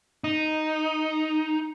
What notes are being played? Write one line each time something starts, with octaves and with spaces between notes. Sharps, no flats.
D#4